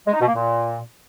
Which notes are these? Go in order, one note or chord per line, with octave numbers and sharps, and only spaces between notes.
G#3
D#4
B2
A#3
A#2